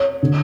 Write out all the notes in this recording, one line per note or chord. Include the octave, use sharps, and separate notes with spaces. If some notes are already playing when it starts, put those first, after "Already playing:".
Already playing: C#5
D3